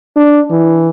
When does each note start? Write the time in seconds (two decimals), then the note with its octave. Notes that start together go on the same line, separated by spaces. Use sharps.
0.16 D4
0.50 E3